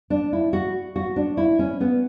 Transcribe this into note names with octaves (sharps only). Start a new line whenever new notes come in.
D4
E4
F#4
F#4
D4
E4
C#4
B3